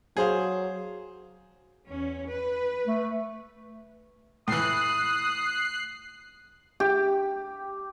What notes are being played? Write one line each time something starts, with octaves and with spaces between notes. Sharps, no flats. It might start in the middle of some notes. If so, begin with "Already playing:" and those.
F#3 G#4 C5 F5
E2 C#4
B4
A3
A2 E3 D#6 F#6 C7
G4